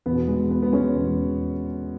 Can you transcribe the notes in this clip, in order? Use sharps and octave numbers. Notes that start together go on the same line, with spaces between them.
E2 B2 B3
G#3
B3
B3
G#3 C#4
E2 B2